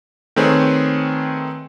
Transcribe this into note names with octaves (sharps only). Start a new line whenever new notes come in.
D#3 A3 C4 G#4 B4 C#5